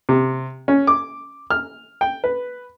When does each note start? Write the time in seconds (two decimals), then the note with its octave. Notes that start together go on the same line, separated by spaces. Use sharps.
0.09 C3
0.68 C#4
0.87 D6
1.50 F6
2.01 G5
2.24 B4